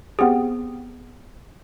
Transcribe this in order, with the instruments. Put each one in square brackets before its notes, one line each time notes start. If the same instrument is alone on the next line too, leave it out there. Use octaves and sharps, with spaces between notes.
[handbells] B3 C4 G4 G#4